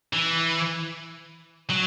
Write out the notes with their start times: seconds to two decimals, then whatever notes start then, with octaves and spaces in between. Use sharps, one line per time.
0.13 E3
1.70 F#3